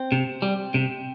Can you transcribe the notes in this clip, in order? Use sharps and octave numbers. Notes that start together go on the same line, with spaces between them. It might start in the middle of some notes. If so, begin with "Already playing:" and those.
Already playing: C4
C3
G3
C3